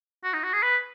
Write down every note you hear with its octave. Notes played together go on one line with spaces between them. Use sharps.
F#4
D#4
F#4
G#4
B4